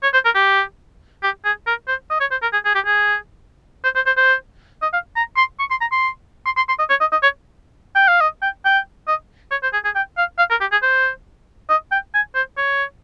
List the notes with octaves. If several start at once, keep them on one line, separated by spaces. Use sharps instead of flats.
C#5
C5
A#4
G4
G4
G#4
A#4
C5
D#5
C#5
C5
A#4
G#4
G#4
G4
G#4
C5
C5
C5
C5
D#5
F5
A#5
C6
C#6
C6
A#5
C6
C6
C6
C6
D#5
C#5
D#5
D#5
C#5
G5
F5
D#5
G5
G5
D#5
C#5
C5
G#4
G#4
G5
F5
F5
A#4
G4
G#4
C5
D#5
G5
G#5
C5
C#5